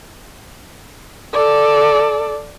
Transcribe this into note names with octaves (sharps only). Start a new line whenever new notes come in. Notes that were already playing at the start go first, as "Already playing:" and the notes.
A4 D5